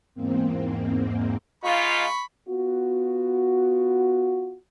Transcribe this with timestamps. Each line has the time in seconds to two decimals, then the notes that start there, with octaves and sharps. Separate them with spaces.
0.14 E2 G#2 A#3 C4
1.64 G#2 D#4 F4 B5 C#6
2.48 B3 F4 F#4